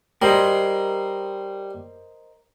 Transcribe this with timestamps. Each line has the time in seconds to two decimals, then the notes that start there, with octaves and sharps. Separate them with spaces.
0.22 G3 A#4 C5 D#5